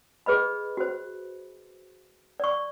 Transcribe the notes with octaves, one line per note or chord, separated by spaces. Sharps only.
G#4 B4 D#5 B5
F#4 C5
D5 C#6